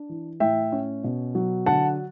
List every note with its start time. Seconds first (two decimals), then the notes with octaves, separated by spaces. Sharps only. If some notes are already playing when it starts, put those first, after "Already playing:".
Already playing: D4
0.09 E3
0.40 A2 E5 G5
0.72 C#4
1.04 B2
1.35 F#3
1.66 D3 F#5 A5